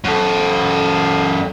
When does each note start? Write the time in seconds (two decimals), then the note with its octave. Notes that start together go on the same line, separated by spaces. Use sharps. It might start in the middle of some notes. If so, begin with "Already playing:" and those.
0.04 F#2 A4